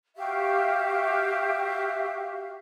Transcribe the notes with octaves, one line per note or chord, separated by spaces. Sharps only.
F#4 G4 E5 F5